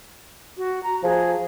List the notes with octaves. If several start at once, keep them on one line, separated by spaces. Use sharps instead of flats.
F#4
A#5
F3 G#4